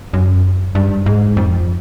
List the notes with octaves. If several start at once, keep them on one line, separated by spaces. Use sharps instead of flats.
F#2
G2
G#2
F2